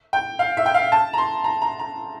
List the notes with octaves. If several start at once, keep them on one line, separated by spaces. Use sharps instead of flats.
G5
F5
E5
G5
F5
A5
A#5
C6
A#5
A#5
A#5